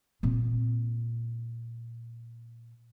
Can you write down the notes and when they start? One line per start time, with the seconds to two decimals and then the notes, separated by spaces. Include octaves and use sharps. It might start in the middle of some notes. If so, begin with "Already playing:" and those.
0.23 A#2 C4